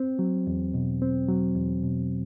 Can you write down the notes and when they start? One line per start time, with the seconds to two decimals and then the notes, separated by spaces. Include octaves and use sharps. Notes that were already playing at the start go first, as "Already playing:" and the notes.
Already playing: C4
0.19 F#3
0.47 E2
0.74 B2
1.02 C4
1.28 F#3
1.55 E2
1.83 B2